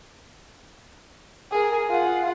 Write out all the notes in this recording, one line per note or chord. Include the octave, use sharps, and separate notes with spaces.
G#4 A#4
F4 F#5